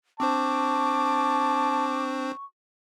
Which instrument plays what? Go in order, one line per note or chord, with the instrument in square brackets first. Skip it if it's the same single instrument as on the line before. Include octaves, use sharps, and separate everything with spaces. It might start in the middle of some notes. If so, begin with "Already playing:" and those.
[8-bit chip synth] C4 D4 C5 [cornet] A5 [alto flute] C#6 [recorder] D6